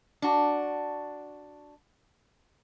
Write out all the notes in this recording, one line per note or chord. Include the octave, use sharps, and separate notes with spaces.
D4 F#4